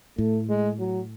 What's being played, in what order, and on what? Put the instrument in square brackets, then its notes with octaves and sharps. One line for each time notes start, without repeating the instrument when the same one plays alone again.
[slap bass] A2 [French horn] A3
[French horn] G#3
F#3